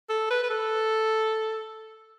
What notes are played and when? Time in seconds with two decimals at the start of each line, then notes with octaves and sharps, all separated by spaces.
0.10 A4
0.31 B4
0.43 B4
0.50 A4